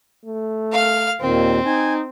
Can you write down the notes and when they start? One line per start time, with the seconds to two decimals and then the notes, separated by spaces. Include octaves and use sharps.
0.25 A3
0.72 F5 F6
1.21 D#2 A#2 D#3 C4
1.66 D#4 G#5